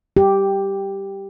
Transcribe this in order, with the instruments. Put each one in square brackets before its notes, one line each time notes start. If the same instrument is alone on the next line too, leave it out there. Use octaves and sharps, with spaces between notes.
[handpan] G4